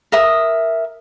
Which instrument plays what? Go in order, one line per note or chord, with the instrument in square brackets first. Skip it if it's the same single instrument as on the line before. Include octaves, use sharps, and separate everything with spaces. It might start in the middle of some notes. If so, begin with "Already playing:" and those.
[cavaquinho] A#4 E5 D#6